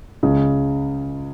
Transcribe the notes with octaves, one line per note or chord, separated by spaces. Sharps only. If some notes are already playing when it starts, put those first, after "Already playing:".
C#2 C#3 G#3